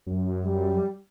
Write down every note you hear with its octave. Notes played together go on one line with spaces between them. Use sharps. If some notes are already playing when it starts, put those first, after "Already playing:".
F#2
G3